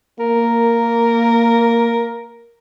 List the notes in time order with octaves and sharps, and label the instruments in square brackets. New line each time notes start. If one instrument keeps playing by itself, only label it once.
[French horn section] A#3 [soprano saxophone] A#4